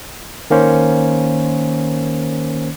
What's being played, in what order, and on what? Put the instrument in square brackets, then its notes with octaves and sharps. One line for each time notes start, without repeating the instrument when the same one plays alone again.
[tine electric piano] D#3 A#3 C#4 C5